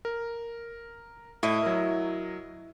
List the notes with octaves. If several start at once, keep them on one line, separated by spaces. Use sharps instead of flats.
A#4
A2 E4 D#5
F#3 A#4